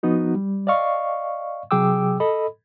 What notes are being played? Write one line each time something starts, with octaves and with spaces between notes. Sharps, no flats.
F3 B3 D#4 F#4
G3
D5 D#5 F5 C#6
C3 F#3 G#4 G5 D6 E6
A4 D#5 B5